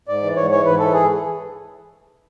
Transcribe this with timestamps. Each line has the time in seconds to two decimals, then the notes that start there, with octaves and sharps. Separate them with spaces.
0.08 G#2 D5
0.22 E3
0.36 G#2 C#5
0.51 E3 C#5
0.65 G#2 B4
0.79 E3 A4
0.93 G#4